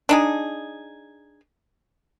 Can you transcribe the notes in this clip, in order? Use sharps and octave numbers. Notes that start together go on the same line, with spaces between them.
D4 D#4 G#4